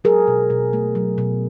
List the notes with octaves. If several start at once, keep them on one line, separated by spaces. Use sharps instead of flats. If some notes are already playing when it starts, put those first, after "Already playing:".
F#3 G#4 A#4
B2
B2
A3
F#3
B2